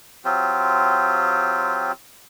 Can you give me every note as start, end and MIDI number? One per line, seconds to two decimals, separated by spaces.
0.25 1.92 54
0.25 1.92 60
0.25 1.92 65
0.25 1.92 67